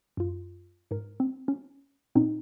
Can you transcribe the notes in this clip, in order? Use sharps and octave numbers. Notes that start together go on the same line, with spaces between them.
F#2 F4
G#2 A#4
C4
C#4
A#2 C4 C#4 D#4